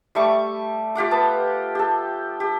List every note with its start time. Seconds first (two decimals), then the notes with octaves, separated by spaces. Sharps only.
0.15 G3 A3 C#6 D6
0.95 F4 G4 F#5 D6
1.11 B3 A5
1.75 G4 A4
2.40 G4